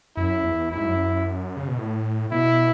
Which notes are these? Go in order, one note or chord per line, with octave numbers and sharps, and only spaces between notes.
F#2 E4
E2
F#2 E4
G#2
F#2
C#3
B2
A2
B2 E4